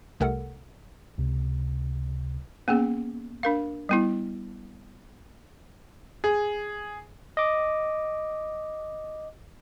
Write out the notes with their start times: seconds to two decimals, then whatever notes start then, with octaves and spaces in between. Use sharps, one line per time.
0.20 C2 C3 A3 A4 A#4 F#5
1.18 C#2 C3
2.68 A#3 B3 C#4 G#4
3.43 D4 A#4 F5
3.89 G3 B3 E4
6.24 G#4
7.37 D#5 D6